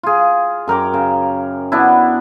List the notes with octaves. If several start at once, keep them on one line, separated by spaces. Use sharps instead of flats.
F4 G#4
F#2 A#4 G5 D6
C#3
B3 D4 E4